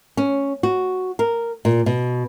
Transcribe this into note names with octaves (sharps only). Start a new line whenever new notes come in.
C#4
F#4
A#4
A#2
B2